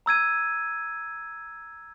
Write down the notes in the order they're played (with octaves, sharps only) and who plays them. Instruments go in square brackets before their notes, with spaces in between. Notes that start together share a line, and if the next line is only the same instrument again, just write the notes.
[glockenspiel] A#5 E6 G#6 D#7